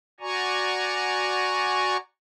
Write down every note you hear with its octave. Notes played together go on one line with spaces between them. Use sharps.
F#4 D5 G#5 A#5 C#6